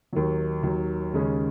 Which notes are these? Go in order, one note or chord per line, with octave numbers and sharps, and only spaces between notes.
D#2 D#3 F#3
D#2 D#3 F#3
D#2 C#3 G#3 C#4